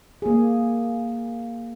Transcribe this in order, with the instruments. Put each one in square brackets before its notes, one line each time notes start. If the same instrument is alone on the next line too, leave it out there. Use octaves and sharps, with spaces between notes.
[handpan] A#3 G#4